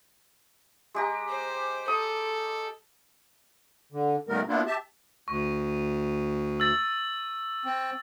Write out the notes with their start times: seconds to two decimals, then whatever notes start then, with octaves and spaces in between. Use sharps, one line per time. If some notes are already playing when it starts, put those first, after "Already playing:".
0.95 G#3 G4 A#5
1.29 C5
1.88 A4 D#6
3.92 D3
4.29 A#2 D#3 G3 A3 B3 A#4
4.48 A#3 B3 D4 E4 F4
4.66 G4 E5 A5
5.28 D2 C#6
6.60 E6 A6
7.65 C4